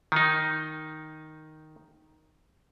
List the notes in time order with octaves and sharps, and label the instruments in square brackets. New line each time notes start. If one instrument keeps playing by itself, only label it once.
[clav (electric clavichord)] D#3 D#4